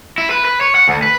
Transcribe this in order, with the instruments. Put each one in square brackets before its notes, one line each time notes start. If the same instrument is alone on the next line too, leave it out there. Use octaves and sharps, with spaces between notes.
[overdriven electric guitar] E4
B4
B4
C#5
F#5
D2
B4